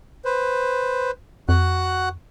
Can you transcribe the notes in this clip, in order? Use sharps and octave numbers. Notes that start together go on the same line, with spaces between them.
B4 C5
F2 F#4 F#5 F#6